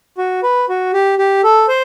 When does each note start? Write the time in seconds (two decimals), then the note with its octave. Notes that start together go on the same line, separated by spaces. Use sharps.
0.18 F#4
0.43 B4
0.69 F#4
0.93 G4
1.19 G4
1.44 A4
1.68 C5